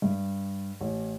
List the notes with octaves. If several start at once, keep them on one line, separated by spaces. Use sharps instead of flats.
G2
A1